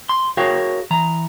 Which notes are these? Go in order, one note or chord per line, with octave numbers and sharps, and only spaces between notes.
C6
F#4 G#4 A#4 C#5 F5 G5
E3 A#5